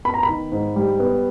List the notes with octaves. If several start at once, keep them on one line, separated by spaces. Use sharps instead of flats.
B3 B5
A#5
B5
D#3
G#2
G3
B3